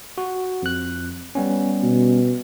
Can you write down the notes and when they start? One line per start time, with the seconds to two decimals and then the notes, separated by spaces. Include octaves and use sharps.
0.18 F#4
0.62 F2 F#6
1.35 G3 B3 C#4
1.83 B2